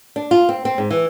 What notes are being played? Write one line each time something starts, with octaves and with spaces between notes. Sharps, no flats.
D4
F4
C4
C4
G#2
E3